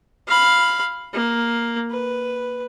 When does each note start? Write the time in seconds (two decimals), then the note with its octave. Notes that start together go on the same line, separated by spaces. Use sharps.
0.27 F5 B5
1.13 A#3
1.91 B4